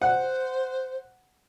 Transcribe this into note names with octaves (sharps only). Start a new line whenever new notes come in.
C5 F#5